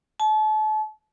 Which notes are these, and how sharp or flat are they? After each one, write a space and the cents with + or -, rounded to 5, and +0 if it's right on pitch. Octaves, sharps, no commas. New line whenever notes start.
A5 -35